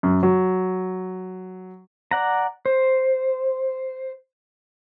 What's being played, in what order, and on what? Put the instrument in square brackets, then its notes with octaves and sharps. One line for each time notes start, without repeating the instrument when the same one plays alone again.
[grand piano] F#2
F#3
[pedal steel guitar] D5 F#5 A#5
C5